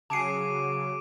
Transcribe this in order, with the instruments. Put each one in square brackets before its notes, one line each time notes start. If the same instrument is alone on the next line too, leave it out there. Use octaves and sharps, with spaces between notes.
[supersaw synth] C#3 F#3 [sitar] G#4 [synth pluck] A5 C7 [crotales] D6 D7 D#7